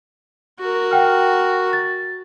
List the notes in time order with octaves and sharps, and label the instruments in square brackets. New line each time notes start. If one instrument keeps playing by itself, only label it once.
[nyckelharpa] F#4 A#4
[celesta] F#5 G5 F6
A6